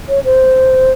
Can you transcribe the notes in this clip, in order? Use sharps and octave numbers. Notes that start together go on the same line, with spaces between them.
C#5
C5